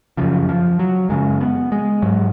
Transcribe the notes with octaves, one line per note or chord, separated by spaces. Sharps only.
F#2 C#3 F3
F3
F#3
F#2 C#3 G#3
B3
G#3
G#2 F#3